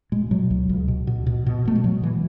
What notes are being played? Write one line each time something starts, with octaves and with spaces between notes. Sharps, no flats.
B2 G#3
B2 F#3
C#2
C#2
B2
B2
B2
B2
B2 A3
G#3
B2 F#3
B2 E3